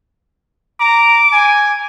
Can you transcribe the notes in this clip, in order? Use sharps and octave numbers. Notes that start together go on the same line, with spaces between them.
A#5 D6
G#5